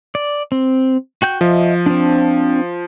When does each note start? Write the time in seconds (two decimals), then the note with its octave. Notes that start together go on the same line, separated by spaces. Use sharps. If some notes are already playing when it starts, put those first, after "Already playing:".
0.15 D5
0.52 C4
1.22 F#4 G5 G6
1.41 F3 D#5 E5
1.86 C4 D4